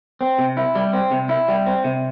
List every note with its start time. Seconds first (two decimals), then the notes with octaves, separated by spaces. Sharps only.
0.21 C4
0.39 C3
0.57 E4
0.75 G3
0.93 C4
1.11 C3
1.29 E4
1.48 G3
1.66 C4
1.84 C3